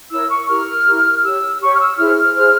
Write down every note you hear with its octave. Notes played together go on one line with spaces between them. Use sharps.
E4 A#4 C#5 E6
C#6
E4 G4 A#4 F6
E4 G4 A#4
G4 C#5 E6
G4 C#5 C#6
F6
E6
E4 G#4 C5 F6
E4 G#4 C5